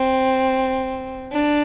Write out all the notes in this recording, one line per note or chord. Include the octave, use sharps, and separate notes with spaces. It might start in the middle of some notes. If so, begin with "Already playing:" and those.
Already playing: C4
D4